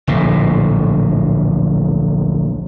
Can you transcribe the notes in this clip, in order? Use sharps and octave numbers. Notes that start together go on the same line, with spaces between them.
D1 A#1 A2